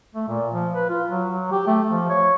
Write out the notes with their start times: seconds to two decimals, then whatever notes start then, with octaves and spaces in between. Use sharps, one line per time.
0.15 A3
0.28 A#2
0.52 F3
0.75 B4
0.89 F4
1.10 F#3
1.33 F#3
1.51 G4
1.67 A3
1.90 F3
2.10 C#5